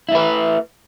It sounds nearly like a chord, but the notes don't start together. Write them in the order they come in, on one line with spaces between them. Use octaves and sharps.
E4 A3 B4